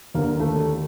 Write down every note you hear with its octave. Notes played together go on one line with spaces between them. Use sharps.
D#2 D3 A#3
A3